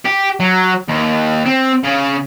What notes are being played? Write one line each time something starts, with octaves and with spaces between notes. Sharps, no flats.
G4
F#3
D#2
C4
C#3